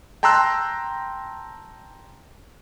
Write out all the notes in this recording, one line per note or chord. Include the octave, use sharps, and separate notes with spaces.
G5 A5 A#5 C6 E6 F#6